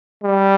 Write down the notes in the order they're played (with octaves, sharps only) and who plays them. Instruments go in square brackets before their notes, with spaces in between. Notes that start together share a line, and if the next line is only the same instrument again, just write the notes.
[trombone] G3